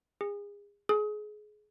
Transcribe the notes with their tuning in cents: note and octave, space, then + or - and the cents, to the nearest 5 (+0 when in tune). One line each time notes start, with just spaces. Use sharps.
G#4 -30
G#4 +25